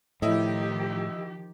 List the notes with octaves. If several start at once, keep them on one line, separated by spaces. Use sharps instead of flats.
A2 D#3 F3 E4 G4 D#5